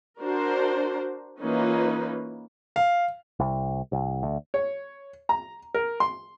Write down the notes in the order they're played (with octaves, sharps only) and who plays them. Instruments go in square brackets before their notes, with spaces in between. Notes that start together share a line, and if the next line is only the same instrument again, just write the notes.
[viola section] D4 F#4 A#4 C5
E3 A#3 C#4 D#4 F4 B4
[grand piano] F5
[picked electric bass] C2
C2
D2
[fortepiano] C#5
A#5
A#4
C6